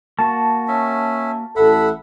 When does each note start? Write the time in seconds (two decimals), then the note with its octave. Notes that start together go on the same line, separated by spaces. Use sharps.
0.19 A#3 F#4 A5
0.68 C#4 E5
1.56 A1 A4 E5 F#5 B5